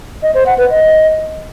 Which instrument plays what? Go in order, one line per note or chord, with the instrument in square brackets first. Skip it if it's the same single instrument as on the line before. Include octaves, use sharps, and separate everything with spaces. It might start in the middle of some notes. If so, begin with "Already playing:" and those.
[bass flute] D#5
C5
F#5
B4
D#5